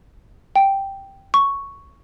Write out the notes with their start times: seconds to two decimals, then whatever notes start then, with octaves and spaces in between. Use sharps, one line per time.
0.56 G5
1.34 C#6